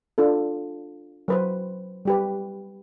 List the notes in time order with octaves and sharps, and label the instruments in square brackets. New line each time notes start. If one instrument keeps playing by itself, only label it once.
[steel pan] D4 F4 A4
F#3 B4 C5
G3 G4 B4